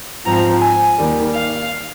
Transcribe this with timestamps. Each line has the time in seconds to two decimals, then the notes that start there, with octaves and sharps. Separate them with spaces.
0.25 G#2 F3 C4 A#5
0.60 G#5
0.98 D#2 D#3 G3
1.33 F5